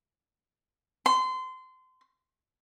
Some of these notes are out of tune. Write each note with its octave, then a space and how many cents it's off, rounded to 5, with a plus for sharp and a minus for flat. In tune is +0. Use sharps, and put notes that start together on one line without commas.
C6 -25